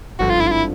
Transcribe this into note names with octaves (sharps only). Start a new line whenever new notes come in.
G#1 G2 D3 F3 F#4
F4
E4
F4
E4